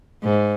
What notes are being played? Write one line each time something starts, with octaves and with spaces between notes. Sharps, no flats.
G#2